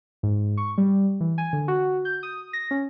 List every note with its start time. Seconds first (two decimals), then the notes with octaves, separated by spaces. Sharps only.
0.23 G#2
0.57 C#6
0.78 G3
1.21 E3
1.38 G#5
1.53 D3
1.68 F#4
2.05 G6
2.23 D#6
2.53 A#6
2.71 C#4